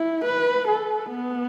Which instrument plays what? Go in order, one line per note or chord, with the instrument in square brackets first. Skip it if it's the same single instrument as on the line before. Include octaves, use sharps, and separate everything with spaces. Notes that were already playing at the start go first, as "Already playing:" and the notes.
Already playing: [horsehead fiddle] E4
B4
A4
B3